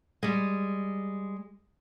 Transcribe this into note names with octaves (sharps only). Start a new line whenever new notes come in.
G3 G#3